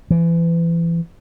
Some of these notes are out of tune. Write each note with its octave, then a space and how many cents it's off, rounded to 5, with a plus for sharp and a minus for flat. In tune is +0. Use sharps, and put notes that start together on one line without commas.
E3 +30